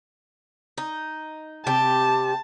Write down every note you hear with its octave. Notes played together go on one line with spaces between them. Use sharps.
D#4
C3 G4 A5